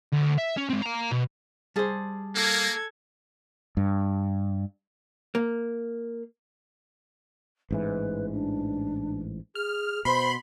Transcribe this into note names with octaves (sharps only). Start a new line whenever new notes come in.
D2
E5
C#4
G#3 C4
F5 A#5
B2
G3 G#4 C5 A5
A#3 A4 G#6
G2
A#3
A1 G#2 E3 B4
D4
G#4 F6
B2 C5 B5 C6